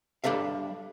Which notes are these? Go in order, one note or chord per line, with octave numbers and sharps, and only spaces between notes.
G3 D4 A4 E5 F5